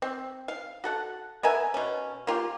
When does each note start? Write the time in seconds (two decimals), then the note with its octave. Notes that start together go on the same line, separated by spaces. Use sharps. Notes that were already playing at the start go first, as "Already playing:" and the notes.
0.02 C4
0.48 F5
0.84 F#4 A4 F#5
1.43 B3 A#4 E5 G#5
1.74 B2 C#4
2.27 A#3 F4 G4